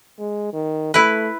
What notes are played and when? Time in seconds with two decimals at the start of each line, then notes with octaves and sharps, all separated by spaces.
0.19 G#3
0.53 D#3
0.94 A3 E4 B4